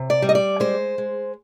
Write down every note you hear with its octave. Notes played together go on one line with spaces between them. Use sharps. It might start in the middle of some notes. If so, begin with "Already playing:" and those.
Already playing: C3
D5
G3
D#5
D5
G#3 C5
G#3